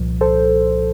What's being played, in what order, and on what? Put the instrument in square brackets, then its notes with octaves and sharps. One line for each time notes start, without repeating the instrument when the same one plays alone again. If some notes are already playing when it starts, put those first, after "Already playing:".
Already playing: [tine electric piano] C2 A#2 F3
[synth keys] A4 C5